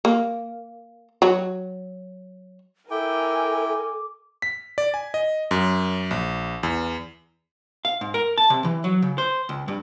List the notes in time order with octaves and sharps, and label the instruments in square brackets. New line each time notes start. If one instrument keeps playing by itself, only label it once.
[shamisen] A#3
F#3
[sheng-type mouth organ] E4 G5 [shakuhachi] A4 [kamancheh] A#4 G#5 [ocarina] D6
[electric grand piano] B6
D5
G#5
D#5
F#2
A#1
E2
[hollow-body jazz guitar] F5
G#2
A#4
A5
C3
E3
F#3
C#3
C5
C#2
G2